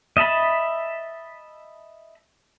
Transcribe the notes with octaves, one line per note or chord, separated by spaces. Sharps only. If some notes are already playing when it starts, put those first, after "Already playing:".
D#5 E5 A5 B5